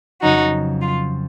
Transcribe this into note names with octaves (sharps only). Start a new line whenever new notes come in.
F2 C#3 F#3 C#4 D#4 F#4
F4